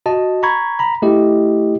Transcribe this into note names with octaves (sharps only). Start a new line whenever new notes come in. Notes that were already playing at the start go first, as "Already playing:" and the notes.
F#4 D#5 A5
A#5 B5 C#6 G#6
A#5 B5
A3 E4 G4 D#5